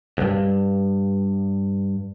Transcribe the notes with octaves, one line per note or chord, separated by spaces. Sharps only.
C2 G2